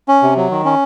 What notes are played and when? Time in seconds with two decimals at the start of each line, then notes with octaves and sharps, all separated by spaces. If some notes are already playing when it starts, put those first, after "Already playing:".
0.08 C#4
0.22 C3
0.36 F#3
0.51 D#3
0.65 C#4